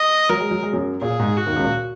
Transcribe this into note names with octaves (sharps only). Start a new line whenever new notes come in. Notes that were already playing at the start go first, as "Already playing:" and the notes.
Already playing: D#5
F#3 A#4
G#3
F#3
G#3
F#2 F#3
A#2 G#4
G#2
F#4
D#2 D#3
C#2 C#3
A#2